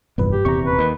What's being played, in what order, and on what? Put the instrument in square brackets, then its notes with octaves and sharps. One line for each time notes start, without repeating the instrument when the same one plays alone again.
[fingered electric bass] F1 A#1 E2 [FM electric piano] G2 B4
[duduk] G4
[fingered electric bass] D#1 E2 C3 [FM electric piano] A#5 C#6
[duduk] B4
[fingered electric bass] D#2